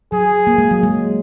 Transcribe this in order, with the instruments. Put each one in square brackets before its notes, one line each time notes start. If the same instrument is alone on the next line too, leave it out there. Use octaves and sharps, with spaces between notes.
[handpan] F#3 [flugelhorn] G#4
[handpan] A#3
G#3
F#3
G#3